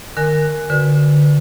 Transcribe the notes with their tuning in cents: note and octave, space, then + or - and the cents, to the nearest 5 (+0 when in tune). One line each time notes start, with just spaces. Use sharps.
D3 +45 A#4 +0 G#5 +0
D3 +0 F#4 +0 B4 +5